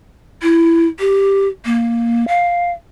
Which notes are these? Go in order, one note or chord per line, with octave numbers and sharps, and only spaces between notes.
E4
G4
A#3
F5